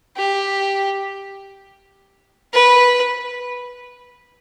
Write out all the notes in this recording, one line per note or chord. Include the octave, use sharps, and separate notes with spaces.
G4
B4